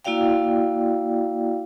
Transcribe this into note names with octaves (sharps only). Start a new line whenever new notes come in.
A#3 E4 F#4 D5 F5 G5